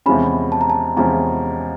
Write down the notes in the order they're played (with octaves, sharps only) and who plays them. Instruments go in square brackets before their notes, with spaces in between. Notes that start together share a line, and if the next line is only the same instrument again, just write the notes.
[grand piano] E2 C3 F3 G#3 C#4 [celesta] B5
[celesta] A5
A#5
A5
[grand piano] E2 C3 F3 G#3 C#4 [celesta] A#5